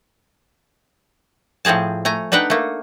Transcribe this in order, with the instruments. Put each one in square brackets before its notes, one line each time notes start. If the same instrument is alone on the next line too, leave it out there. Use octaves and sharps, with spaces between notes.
[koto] A2 F3 C4 G#4 A5
A3 G#5 A#5
D4 D#4 B4 F#5 G5
A3 A#3